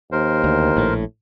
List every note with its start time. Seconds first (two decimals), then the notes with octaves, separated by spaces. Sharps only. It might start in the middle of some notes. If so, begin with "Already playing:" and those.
0.12 D#2 A#4 C5
0.44 D2
0.76 A#1 A2